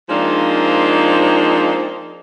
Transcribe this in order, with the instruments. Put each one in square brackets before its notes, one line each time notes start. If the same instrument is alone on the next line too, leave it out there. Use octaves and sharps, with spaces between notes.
[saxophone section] F3 G#3 A#3 C4 D4 D#4